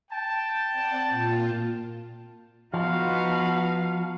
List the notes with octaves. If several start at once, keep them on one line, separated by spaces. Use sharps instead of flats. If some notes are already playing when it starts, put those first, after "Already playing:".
G5 A5
C4 D5 F#5
A#2 F4
F3 B3 D#4 F#4 F5